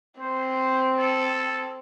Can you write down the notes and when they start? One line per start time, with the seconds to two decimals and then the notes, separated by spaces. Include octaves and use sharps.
0.20 C4 C5
0.98 A4